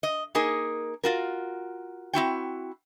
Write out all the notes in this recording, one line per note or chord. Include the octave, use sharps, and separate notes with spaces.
D#5
A#3 D#4 G#4 A#4
F4 F#4 A#4
C4 E4 F#4 G5